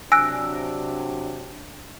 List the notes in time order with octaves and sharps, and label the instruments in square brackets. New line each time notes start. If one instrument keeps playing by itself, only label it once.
[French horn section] C3 F#3 D4 [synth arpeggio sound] G#5 A#6 D7 [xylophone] E6 F#6